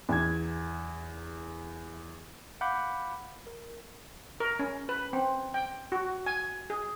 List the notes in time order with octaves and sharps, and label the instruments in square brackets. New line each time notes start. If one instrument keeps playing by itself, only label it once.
[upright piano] E2 G#6
[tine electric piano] F5 F#5 B5 D6 G6
A#4
[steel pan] A#4
C#4
B4
C4
G5
F#4
G#5
G#4